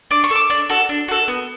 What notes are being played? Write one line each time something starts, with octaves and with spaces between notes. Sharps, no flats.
D4 D6
C#6
A4
D6
D4
F#4 A4
D4
F#4 A4
B3